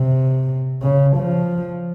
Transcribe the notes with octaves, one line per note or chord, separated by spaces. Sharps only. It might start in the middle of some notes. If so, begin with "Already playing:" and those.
Already playing: C3
C#3
F3